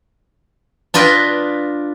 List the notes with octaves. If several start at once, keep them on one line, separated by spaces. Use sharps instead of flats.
D4 F4 B4 D#5 G5